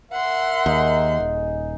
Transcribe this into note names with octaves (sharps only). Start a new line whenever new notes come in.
A#4 E5 F#5 C6
D#2 D#4 G#4
D#1